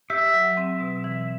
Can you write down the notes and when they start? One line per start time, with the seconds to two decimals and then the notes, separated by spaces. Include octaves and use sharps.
0.10 G4 E5
0.34 F#3
0.57 C4
0.80 B2
1.04 E3